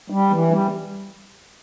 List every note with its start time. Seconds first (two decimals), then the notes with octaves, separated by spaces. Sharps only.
0.10 G3
0.31 E3
0.51 G3